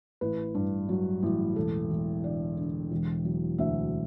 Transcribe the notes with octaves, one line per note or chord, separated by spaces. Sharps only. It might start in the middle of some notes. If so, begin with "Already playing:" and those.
A1 B4
G2
F#3
A1
E1 A4
E1
D3 D5
D3
E1
F#3
D2 E5